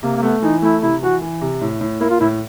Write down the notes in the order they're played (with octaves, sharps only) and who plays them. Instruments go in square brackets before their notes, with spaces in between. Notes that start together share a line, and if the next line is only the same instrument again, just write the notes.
[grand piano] C3 [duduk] A#3
[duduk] A#3
[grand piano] A3 [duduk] B3
[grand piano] E3 [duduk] D#4
[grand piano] A3 [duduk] E4
[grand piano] C3 [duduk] E4
[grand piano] E3 [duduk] F#4
[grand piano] E3
C3
A2
A2
[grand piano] A#3 [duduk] E4
[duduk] F4
[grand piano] A2 [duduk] E4